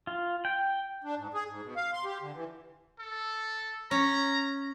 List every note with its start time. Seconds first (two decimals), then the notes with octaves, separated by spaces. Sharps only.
0.07 F4
0.45 G5
1.04 D4
1.17 G#2
1.34 G#4
1.48 G#2
1.62 B2
1.76 F5
1.93 C6
2.05 G4
2.22 D3
2.34 E3
2.99 A4
3.91 C#4 A#5